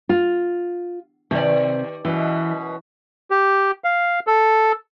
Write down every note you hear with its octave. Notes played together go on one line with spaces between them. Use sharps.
F4
C3 D#3 D5
F#2 B2 E3
G4
F5
A4